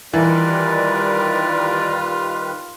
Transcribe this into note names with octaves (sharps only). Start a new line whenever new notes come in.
D#3 E3 G3 F4 A#4 B4 D5